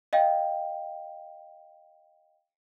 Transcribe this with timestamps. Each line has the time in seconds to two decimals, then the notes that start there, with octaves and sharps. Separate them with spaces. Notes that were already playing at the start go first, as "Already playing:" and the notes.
0.13 D#5 F5 G5